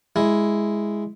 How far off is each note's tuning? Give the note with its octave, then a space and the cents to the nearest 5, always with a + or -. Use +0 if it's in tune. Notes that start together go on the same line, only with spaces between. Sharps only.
G#3 +0 E4 +0